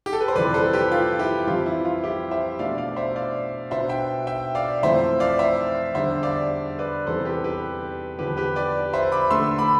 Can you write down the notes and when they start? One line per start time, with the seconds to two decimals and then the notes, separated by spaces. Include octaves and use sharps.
0.06 G4
0.13 A4
0.20 B4
0.28 C5
0.36 F2 C3 E3 G3 B4 D5
0.54 A4 C5
0.73 G4 B4
0.92 F4
1.19 E4 G4
1.47 F2 E3 G3 C4 F4
1.66 E4
1.85 F4
2.03 E4 G4
2.31 C5 E5
2.59 B2 A3 D4 D5 F5
2.78 D5 F5
2.96 C5 E5
3.16 D5 F5
3.71 B2 B3 D4 C5 E5
3.89 E5 G5
4.27 E5 G5
4.55 D5 F5
4.83 F2 E3 A3 C4 C5 E5
5.20 D5 F5
5.39 C5 E5
5.95 E2 D3 G3 D4 C5 E5
6.22 D5 F5
6.79 B4 D5
7.07 E2 C3 E3 G3 C4 A4 C5
7.25 G4 B4
7.44 G4 B4
8.19 E2 D3 F3 G4 B4
8.37 G4 B4
8.56 B4 D5
8.93 C5 E5
9.12 B5 D6
9.31 D3 A3 D4 C6 E6
9.58 B5 D6